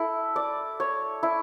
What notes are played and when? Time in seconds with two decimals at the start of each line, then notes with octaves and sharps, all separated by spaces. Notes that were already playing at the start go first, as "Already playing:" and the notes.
Already playing: E4 A4
0.36 D5
0.80 C#5
1.23 E4